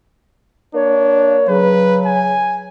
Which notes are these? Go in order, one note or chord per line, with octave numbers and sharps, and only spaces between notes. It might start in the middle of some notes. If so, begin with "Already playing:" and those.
A#3 D4 C#5
C#3 F#3 B4
G#5